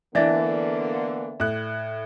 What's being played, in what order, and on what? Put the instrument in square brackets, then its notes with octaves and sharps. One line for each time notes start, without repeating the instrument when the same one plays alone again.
[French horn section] D3 A#3 B3 [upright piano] E3 D4 [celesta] D5 E5 A6
[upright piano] A2 F#6